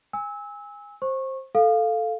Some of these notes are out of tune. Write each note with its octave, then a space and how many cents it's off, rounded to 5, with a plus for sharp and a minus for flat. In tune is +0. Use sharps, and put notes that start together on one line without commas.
G#5 -20 E6 -25
C5 +15 C#6 -20
A4 +0 F5 +0